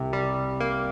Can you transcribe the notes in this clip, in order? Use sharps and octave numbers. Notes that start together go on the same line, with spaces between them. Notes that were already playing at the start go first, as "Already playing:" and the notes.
Already playing: C2 C3
G3
A#3